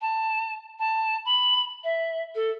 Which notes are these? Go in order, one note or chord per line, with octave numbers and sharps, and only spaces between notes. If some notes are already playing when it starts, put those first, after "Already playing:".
A5
A5
B5
E5
A4